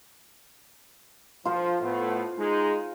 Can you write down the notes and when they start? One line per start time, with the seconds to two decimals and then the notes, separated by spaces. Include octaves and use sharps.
1.45 F3 F4 C5
1.81 A2 A3 B3
2.39 G#3 D#4 G#4